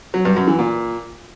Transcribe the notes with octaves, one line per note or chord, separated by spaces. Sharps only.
F#3
G2
F#2
E3
A#2